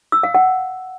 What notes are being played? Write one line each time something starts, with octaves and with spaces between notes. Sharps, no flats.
E6
F5
F#5